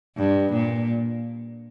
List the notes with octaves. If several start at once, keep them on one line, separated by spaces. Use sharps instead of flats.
G2
A#2